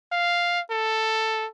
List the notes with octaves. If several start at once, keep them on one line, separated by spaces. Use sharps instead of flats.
F5
A4